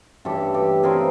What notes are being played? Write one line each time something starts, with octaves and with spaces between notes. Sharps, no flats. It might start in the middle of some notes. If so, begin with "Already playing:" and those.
G2 E3 A3 C#4 G4 A4
G4 A4
C#3 E3 G3 C4 G#4 A#4